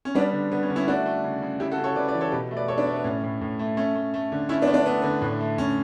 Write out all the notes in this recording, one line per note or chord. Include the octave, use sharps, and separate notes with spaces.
C#4
G3 B3 D4
D3
D3 B3
C#4
D3
C#4 E4
A3 D4 F#4
A3
C#3
C#3
C#3 E4 G4
F#4 A4
C#3
A4 C#5
C#3 B4 D5
B4 D5
E3
A4 C#5
B2 G4 B4
A3
B4 D5
A3 A4 C#5
B3 D4
A3
B3
A2 C#4
A2
A2
A3
A3 C#4
A3
A3
D3
A3 C#4 E4
B3 D4
A3
B3 D4
A3 B3
D3 B3
A2
A3
A2 C#4